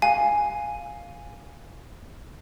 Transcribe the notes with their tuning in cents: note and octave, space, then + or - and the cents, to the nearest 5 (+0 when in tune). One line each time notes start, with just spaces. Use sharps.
F5 +0 G#5 +0